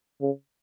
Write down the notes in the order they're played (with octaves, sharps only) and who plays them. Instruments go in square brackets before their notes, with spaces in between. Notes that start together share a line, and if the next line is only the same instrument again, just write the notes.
[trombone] C#3